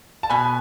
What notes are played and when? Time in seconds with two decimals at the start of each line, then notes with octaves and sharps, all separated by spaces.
0.23 A5
0.30 B2 G#5 B5